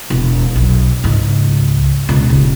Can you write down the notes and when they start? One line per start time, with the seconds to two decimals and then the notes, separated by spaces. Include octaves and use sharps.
0.10 E1
0.56 B1
1.04 C#2 G#2
2.09 C#2 B2
2.30 D#1